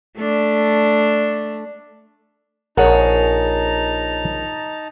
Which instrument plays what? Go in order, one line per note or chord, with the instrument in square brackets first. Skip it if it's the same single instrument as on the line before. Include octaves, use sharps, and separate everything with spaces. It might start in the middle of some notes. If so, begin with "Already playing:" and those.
[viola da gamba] A3 D4
[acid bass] A#1 [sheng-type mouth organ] D#4 A5 A#5 [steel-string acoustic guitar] G#4 C#5 [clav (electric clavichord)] A#4 F#5